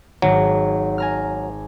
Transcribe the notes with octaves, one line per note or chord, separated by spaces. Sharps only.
G#1 F#3
G#5 A#5 F6